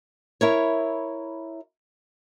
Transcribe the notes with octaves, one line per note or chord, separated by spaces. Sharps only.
E4 A#4 C#5